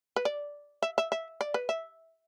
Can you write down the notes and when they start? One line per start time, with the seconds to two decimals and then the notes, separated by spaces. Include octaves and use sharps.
0.16 B4
0.25 D5
0.82 E5
0.98 E5
1.12 E5
1.41 D5
1.54 B4
1.69 E5